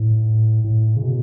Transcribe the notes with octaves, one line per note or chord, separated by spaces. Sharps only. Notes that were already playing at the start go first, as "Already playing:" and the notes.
Already playing: A2
A2
C#3
B2